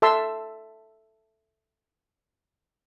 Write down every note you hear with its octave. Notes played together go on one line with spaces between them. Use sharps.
A4 E5 A5 C6 E6